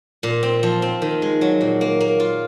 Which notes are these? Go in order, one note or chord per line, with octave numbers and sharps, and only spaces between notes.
A#2
C4
F3
C4
D#3
G#3
F#3
A#2
A#3
A#3
F4